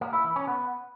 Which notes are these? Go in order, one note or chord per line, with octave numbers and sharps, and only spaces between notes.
A#3
E4
E3
C#4
B3